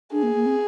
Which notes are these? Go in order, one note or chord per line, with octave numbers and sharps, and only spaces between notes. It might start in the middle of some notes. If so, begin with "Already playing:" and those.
D4 G#4
A#3
A#3
C4